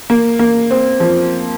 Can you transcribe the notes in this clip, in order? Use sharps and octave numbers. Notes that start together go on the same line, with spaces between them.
A#3
A#3
C4
F3